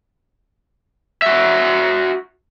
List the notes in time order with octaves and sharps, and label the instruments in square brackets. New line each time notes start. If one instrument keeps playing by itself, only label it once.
[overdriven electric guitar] F#4 E5